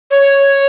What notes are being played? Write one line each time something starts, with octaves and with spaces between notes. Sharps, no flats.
C#5